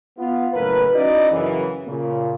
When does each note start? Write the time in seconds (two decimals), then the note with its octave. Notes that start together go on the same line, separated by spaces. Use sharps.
0.18 B3 F4
0.53 F#1 A2 A#4 B4
0.93 C#4 D#4 E4 F#4 D5 D#5
1.32 F#2 C#3 E3
1.86 A#2 C#3